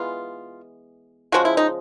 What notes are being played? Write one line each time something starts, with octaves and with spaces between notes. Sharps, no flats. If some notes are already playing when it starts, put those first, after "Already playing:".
Already playing: E3 G#3 B3 F4
C#3 F3 G#3 F#4
E4
D#4